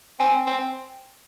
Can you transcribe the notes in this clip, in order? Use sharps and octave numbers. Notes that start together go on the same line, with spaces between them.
C4 G#5
C4